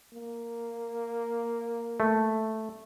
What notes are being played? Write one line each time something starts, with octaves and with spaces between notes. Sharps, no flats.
A#3
A3